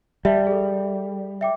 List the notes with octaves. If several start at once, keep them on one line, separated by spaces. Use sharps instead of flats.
G3 E5 A5
G#4 A4
E5 G5 D6